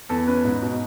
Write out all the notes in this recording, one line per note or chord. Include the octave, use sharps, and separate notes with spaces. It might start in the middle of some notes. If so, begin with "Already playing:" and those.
E2 A4
C#4 B4
G#2
B2